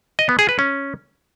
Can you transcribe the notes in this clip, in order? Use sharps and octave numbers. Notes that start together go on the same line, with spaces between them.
D#5
B3
G#4
B4
C#4